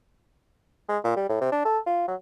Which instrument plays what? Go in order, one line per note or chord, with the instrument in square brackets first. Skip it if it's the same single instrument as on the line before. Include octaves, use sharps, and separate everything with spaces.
[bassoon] G#3
A#2
G3
A2
C3
D4
A4
F4
F#3